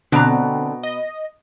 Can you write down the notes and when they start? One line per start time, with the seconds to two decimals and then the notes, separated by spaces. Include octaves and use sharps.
0.12 B2 D3 C4 D4 A#5
0.83 D#5